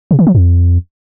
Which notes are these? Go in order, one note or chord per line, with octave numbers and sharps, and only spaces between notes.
C3
D#3
F3
F2